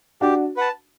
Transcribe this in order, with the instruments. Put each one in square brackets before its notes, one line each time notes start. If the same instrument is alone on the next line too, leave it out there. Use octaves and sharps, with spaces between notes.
[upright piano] D4 F#4 [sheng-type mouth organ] G4
[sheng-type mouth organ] B4 F#5 A5